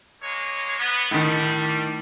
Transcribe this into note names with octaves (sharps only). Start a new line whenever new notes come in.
G#3 A#3 C#5
B3
A2 D#3 G3